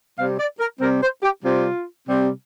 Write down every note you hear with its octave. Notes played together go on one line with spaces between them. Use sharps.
C3 G3 C4 F5
D5
A#4
C3 G3 C4 A#4
C5
G4
C3 G3 C4 F4
C3 G3 C4